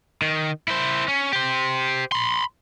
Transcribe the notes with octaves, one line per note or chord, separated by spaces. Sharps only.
D#3
E4 C5
C#4
G4 C5
B5 C6